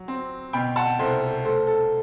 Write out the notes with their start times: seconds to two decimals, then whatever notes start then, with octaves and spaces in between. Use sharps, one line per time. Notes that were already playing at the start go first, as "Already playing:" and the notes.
Already playing: F#3
0.08 C4
0.53 B2 G5 B5
0.76 F#5 A5
0.99 C2 A4 C5
1.21 A4
1.45 A3 A4 C5
1.67 A4